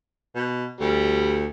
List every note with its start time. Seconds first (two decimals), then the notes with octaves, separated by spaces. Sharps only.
0.35 B2
0.81 D2 G3